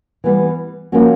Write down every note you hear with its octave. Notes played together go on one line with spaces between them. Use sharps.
E3 G3 B3
F3 A#3 C#4 F#4